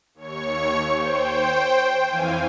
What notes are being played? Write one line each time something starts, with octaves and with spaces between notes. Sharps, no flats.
D#2 C#5 C#6
C5 G5
F2 E3 F5 G#5